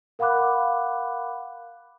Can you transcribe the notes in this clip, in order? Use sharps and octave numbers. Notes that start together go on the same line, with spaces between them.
A#4 F5 F#5 B5 D6 F#6